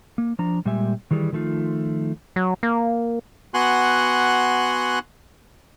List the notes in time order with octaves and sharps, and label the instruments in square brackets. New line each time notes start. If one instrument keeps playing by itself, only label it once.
[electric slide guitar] A#3
F3 D4 A#5
A#2 G3 G#3 G4 E5 G#5
D#3 E3 G3 G#4
D#3 F3 A3 D#4 F4
[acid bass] F#3
A#3
[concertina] B3 F#4 F#5 G#5 C6 F#6